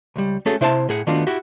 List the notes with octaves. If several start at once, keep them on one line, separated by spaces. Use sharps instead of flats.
C#2 G3
A3 C#4 F#4 G#4 A4
C3 E4 C5 F5 G#5 A5
A2 G#4 F#5
D#3 A3 B3 D4 F4 F#4
E4 F#4 G4